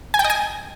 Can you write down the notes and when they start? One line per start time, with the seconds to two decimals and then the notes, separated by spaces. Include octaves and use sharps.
0.14 G#5
0.19 G5
0.24 D#5
0.30 G#5